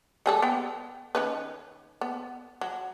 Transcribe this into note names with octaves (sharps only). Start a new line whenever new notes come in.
G3 G#4 A4
B3 G5
D#3 C#4 B4
B3
F#3